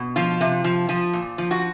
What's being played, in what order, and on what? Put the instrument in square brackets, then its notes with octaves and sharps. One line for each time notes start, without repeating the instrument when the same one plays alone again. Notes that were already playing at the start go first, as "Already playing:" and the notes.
Already playing: [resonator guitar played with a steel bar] B2
F3 F4
C3
F3
F3
A#2
F3
F#4